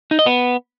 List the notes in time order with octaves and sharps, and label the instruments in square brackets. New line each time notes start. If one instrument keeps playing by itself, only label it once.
[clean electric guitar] D#4
D#5
B3